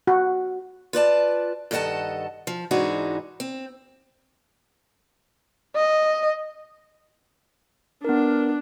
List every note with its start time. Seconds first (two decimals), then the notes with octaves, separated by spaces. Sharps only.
0.07 F#4
0.93 F4 B4 D5 A5
1.71 G2 D#3 A4 D#5 F#5 A5
2.47 F3
2.71 G#2 E3 G#3 D4 D#4 F#4
3.40 C4
5.76 D#5
8.05 B3 D4 A#4